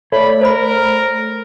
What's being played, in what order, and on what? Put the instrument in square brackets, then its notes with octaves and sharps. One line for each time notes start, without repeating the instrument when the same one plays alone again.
[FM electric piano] A3 [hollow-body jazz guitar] C#5 D5 [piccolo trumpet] B5
[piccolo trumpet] A#4 [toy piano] C5 B5